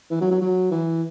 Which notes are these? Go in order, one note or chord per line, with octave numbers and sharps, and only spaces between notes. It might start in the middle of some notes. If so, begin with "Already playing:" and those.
E3
F#3
F#3
F#3
E3